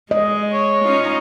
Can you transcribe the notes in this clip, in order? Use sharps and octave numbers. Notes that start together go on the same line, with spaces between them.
G#3 D#5
C#5
C#4 D#4 F4